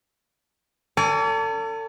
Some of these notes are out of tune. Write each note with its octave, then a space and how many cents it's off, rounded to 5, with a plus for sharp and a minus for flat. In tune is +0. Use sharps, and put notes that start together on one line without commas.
A4 +35 D5 -45 G#5 +0